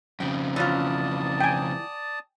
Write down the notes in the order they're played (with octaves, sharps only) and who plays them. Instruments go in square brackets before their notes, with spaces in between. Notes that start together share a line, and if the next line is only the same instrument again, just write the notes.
[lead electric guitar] F2 C#3 [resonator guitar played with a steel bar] G5
[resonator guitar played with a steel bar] E3 C#4 F4 [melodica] D5 A5 D#6
[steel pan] G5 G#5